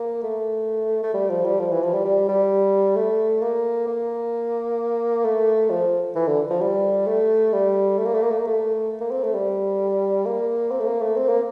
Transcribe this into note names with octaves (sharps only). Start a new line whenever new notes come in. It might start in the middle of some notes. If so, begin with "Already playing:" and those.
Already playing: A#3
A3
A3
G3
F3
G3
F3
E3
F3
G3
G3
G3
A3
A#3
A#3
A3
F3
E3
D3
F3
G3
A3
G3
A3
A#3
A3
A#3
A3
A#3
A3
A#3
C4
A3
G3
A#3
C4
A3
A#3
A3
C4
A#3